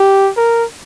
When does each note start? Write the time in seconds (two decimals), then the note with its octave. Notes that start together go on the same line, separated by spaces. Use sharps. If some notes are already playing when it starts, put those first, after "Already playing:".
Already playing: G4
0.37 A#4